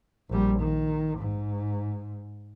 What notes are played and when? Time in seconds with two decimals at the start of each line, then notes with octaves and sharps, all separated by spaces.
0.30 A#1 G3
0.60 D#3
1.19 G#2